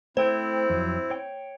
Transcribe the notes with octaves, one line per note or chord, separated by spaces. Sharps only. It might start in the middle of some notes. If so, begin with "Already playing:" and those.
A3 C4 E4 C5 G5
F2 F#3
C#5 G5